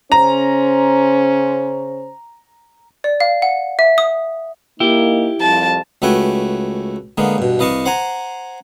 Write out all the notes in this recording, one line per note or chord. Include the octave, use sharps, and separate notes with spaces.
C#3 C#4 C5 A#5
D5
F5
F#5
E5
D#6
A#3 D#4 E4 G4
C2 F2 F3 A5
C#2 A3 F#4 B4 G5 G#5
D3 G#3 A#3 B3
G2 B2
C2 B4 D#5 F5 A5 C#6
C5 F#5 G#5 A#5